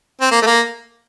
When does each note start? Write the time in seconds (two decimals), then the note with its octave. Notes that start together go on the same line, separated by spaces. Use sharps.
0.21 C4
0.31 A#3
0.42 A3
0.46 A#3